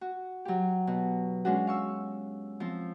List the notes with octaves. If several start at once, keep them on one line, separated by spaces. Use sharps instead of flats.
F#4
F#3 G4
B2
G#3 C#4 D4 F#4
F5 C#6 E6
F3 C4